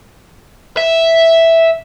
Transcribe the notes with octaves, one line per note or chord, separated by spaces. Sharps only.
E5